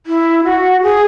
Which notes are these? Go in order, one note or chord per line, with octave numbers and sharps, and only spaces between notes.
E4
F#4
G#4